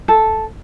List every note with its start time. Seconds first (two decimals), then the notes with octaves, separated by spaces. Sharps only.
0.08 A4